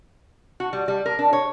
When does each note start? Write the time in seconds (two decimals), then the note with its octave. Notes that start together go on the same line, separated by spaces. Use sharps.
0.60 F#4
0.73 G3
0.88 G3
1.06 A#4
1.19 D4
1.33 C#5